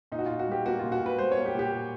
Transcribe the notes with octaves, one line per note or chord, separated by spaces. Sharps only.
A#2 D#4
F#4
A#2 F4
F#4
G3 G4
A#3 F#4
A#2 F4
F#4
A#2
B4
G3 C5
C#5
A#3
G4
A#2
G4
A#2